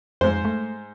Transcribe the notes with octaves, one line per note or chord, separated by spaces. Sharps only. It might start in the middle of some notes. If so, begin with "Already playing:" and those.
F2 G#2 C5
A3